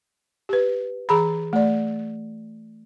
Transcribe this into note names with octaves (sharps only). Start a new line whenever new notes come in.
G4 B4
E3 G#4 A#5 B5
A3 D5